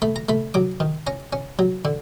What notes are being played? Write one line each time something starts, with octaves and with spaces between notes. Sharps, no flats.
A3 B5
A#5
A3 B5
F#3 D6
D#3
C#4 A#5
C#4
F#3
D3